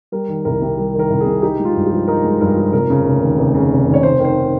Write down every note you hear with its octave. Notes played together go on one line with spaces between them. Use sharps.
G3 A#4
D#3
C2 A#4
C3
G3
D#3
A#4
C2
G#4
C3
D#4 G4
G#3
F4
G2
G4
F3
D#4 A#4
G#3
G2 A#4
F3
F1 A#4
C#3
F1
D#2
F1
C#3
F1
D#2
C#5
F1 C5
D#3
C5